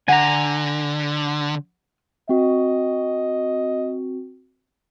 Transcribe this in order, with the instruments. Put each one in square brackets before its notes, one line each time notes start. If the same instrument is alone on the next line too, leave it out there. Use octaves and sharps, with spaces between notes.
[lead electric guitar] D3 [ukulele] F#5 [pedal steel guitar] G#5 A#5
[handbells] C4 F#4 [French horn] D#5